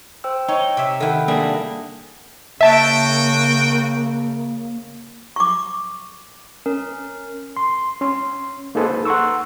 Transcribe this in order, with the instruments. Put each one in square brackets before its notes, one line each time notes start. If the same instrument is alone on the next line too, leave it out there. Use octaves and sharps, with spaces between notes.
[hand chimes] C5 G5 E6
[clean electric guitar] D#4 [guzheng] C#5 [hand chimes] G5
[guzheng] C3 E5
[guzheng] D#3 E4 [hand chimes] A4 F#5 G5
[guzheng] G3 [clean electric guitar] A#3 D4 G#4
[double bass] C#3 [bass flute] A#3 [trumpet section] F#4 G5 [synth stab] E5 A5
[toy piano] C#6 D6
[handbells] C#4 A#4
[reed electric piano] C6
C#4 C6
A#3 D#4 G#4 A4 B4 C5
F#5 A#5 C6 C#6 E6